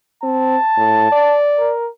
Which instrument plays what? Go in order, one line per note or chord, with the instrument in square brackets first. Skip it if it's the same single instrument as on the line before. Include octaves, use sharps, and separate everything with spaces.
[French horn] C4 [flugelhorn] A5
[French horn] A2
D5
[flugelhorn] A#4